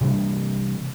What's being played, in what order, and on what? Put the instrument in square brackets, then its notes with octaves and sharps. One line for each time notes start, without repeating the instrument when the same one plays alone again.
[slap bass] C3 E3 G3 D4